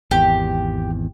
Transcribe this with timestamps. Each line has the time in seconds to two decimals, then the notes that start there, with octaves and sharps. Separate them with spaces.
0.11 G#1 E2 G4